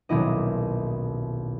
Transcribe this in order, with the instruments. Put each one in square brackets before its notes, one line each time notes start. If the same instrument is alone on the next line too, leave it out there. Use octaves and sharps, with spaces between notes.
[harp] D#1 B1 E4 D#5